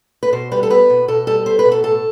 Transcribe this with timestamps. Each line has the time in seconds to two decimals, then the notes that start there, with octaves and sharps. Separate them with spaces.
0.23 B4
0.33 B2 C5
0.52 G3 B4
0.63 A4
0.70 B3 B4
0.90 B2
1.08 B2 A4
1.27 G3 A4
1.46 B3 C5
1.59 B4
1.65 B2
1.72 A4
1.84 A2 A4